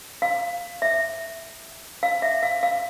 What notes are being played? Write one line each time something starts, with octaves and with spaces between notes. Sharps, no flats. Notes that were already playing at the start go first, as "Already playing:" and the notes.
F5
E5
F5
E5
F5
F5